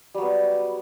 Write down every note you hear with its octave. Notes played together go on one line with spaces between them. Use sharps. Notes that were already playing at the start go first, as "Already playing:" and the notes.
F#3 G3 B3